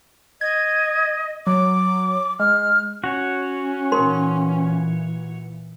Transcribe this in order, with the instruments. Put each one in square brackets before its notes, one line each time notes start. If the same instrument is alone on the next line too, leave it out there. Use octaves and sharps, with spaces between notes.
[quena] D#5 [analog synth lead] G#6
[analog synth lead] F#3 [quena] D6
[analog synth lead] G#3 [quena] F6
[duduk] C#4 [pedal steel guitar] F#4 C#5
[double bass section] A#2 E3 [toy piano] D#4 A#4 C6